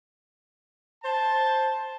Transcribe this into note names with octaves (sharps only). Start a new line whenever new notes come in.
C5 A5